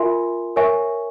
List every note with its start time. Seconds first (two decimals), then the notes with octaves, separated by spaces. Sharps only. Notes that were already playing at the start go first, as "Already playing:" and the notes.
Already playing: F4 A#4 E5 G#5 C6
0.56 A#4 C#5 E5 G#5 C#6